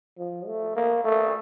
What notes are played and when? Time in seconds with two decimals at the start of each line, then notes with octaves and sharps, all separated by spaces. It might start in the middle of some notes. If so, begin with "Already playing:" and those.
0.18 F3
0.47 A3
0.76 A#3
1.04 A3